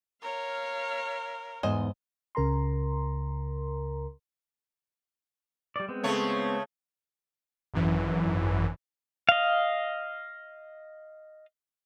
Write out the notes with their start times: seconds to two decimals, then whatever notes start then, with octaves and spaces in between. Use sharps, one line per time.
0.23 A#4 C#5 F5
1.63 E2 G#2 C5 D#5 G#5
2.35 C#2 C#3 A#4 A#5 C6
5.76 G3 D5
5.89 G#3 B3 C4
6.04 C#3 A3 C#5
7.74 G#1 F#2 E3
9.29 D#5 F5